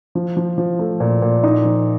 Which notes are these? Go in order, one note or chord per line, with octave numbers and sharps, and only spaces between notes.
F3
F3
F3
A3
A#2
A#2
D#4
F3